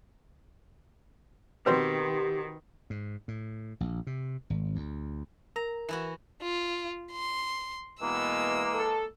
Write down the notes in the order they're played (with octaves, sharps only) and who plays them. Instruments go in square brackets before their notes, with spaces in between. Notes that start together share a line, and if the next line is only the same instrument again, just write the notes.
[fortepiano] B2 C4 C5 [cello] D#3 [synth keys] G4 [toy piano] B4
[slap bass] G#2
A2
A#1
C3
G#1
D2
[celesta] A#4 [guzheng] A#5
[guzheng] E3 E4 F#4
[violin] F4
C6
[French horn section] B2 B3 [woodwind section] E3 G#3 A#3 [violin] E6
[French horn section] A4